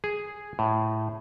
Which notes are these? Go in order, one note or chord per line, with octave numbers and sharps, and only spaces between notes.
G#4
A2